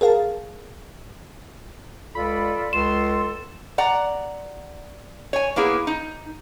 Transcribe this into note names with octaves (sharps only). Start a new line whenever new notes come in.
G#4 A#4 F5 A5
C#2 F4 A4 D5 B5
C#2 A4 C6 E7
D5 F#5 A#5
C#5 G#5
A#3 B3 E4 G#4
D#4